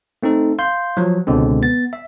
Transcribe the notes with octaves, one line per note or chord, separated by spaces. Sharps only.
A3 C4 D#4 A4
F5 C6 G6
F3 F#3
C#2 B2 D3 G#3 C4
B3 A6
E5